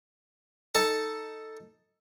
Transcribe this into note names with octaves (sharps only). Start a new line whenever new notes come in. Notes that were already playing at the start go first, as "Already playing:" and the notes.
D#4 A4 A5